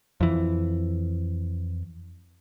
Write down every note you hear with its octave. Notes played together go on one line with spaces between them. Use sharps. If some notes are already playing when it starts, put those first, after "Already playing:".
F2 E3